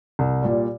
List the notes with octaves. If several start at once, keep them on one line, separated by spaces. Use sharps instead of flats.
C2
A#2 G3